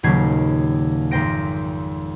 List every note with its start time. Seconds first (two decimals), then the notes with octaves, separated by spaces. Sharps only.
0.03 D#1 D#2 C#3 F#3 G#6 C7
1.11 G#1 F2 C5 G5 A#6 D7